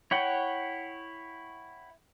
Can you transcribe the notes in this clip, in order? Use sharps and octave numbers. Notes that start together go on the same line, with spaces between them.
E4 C#5 F#5 G5